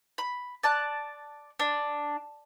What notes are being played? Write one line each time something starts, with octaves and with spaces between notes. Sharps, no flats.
B5
D5 A5 F#6
D4